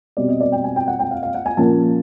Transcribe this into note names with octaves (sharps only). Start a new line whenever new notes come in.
B2 G3 C4 D5
D#5
D5
G5
G#5
G5
F#5
G5
F5
F5
F#5
G#5
A#2 F3 A#3 C#4 A5